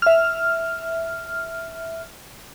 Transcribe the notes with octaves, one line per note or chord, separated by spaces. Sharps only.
E5 F6